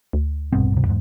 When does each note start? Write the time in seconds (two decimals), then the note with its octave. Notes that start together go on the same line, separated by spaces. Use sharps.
0.13 D2
0.53 A#1 G2 B2 C4
0.72 D1 C3
0.85 E2 G#2